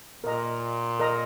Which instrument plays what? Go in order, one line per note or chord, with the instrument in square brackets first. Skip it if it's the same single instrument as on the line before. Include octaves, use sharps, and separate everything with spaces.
[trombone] A#2 [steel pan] A#4 D#5 A#5
[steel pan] A#4 D#5 A#5